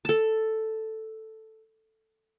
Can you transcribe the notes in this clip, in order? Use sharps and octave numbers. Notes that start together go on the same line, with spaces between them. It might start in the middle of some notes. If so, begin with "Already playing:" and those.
A4 A5